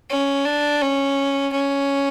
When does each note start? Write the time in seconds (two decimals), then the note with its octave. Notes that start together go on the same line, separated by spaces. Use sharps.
0.10 C#4
0.46 D4
0.81 C#4
1.53 C#4